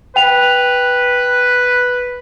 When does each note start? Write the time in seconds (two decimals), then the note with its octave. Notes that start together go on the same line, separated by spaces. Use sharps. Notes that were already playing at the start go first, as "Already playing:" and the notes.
0.16 B4 G5 F7